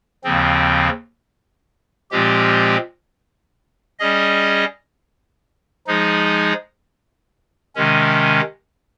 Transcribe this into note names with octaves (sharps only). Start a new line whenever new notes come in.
D#2 C#3 F3 C4
A#2 F3 G#3 C4 G4
G3 C#4 G#4 D#5
F3 G#3 D#4 G#4
C3 D#3 G#3 C#4